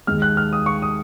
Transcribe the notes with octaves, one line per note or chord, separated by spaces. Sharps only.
D#2 D#3 G#3 F6
F#6
F6
D#6
C#6
D#6